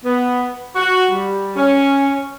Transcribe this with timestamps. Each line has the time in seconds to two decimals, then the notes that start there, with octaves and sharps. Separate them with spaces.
0.05 B3
0.76 F#4
1.11 G3
1.56 C#4